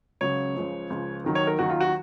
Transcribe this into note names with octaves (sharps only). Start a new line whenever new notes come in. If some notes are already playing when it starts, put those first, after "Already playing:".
C#2 C#3 F#3 C#5
C#2 C#3 F3
C#2 C#3 F3
D#2 D#3 F#3
C#5
A#4
D#2 D#3 F#3 F#4
F4
F#4